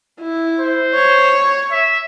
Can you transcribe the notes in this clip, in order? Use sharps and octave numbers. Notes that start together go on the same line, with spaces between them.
E4
C5
C#5
E5